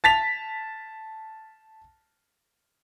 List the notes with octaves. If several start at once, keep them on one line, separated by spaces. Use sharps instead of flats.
A5 A6 B6 F7